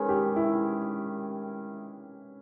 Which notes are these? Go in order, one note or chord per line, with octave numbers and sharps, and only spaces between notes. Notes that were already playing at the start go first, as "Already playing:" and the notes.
Already playing: D#3 G#3 C#4 B4
G4
E4